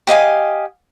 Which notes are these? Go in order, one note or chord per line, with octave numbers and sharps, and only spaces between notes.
G4 D#5 F5 G#5